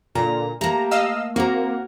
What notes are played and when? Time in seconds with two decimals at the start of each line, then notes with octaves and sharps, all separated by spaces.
0.15 A#2 D3 A#5
0.61 A3 A#3 G4 A#5
0.91 D#5 F5 E6
1.36 A#3 C4 F#4 A#4